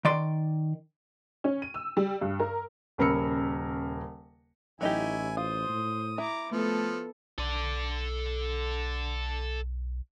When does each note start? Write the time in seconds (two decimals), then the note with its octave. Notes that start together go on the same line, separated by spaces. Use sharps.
0.05 D#3 D5 C6
1.44 C#4
1.62 D#7
1.74 E6
1.97 G3
2.21 G2
2.40 A#4
2.98 D#1 C#3 A#4 B5 E6 C#7
4.81 A1 F#3 D#4 E4 G4 G#5
5.37 F4 C5 D#6
5.69 A2
6.18 E4 A#5 D6
6.52 F3 A3 B3 A4
7.38 B1 A4 D5